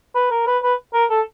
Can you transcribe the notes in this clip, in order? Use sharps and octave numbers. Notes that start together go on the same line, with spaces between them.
B4
A#4
B4
B4
A#4
A4